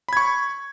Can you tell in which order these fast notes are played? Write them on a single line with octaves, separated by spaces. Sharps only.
B5 G#6 C#6